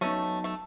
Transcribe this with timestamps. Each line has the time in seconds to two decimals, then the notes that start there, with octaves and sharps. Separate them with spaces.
0.01 F#3 A3 B3 C#4 D#4
0.44 A3